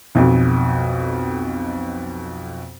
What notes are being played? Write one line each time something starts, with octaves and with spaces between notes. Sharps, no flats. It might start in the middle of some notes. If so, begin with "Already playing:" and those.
B1 F2 B2